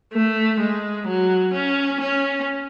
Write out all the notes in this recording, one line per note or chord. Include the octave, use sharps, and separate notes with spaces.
A3
G#3
F#3
C#4
C#4